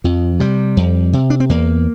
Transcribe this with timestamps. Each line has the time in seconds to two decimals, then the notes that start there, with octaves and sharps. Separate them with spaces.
0.04 F2 F3
0.40 C3 G3
0.77 F2
1.13 C3
1.30 D4
1.40 C4
1.50 E2 A#3